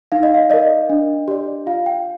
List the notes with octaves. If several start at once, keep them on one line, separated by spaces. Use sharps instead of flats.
D#4 F5
D#5
F5
A#4 D5 D#5
D4
G4 D5
F4 F5
G5